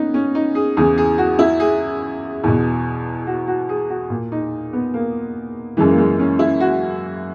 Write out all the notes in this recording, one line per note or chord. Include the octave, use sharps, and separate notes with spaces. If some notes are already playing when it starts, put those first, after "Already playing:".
Already playing: A#3 B3 C#4 D#4
C#4
D#4
G#4
E2 C#3 E3 G#4
G#4
F#4
E4
G#4
E2 B2
F#4
F#4
G#4
F#4
A#2
D#4
B3
A#3
F#2 C#3 E3 G#3
A#3
G#3
C#4
E4
F#4